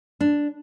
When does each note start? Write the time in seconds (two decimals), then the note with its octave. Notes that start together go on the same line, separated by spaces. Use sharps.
0.21 D4